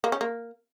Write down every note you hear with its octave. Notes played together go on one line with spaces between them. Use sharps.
A#3
C#4
A#3